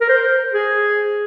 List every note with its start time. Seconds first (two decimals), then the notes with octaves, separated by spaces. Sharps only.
0.01 A#4
0.09 C5
0.53 G#4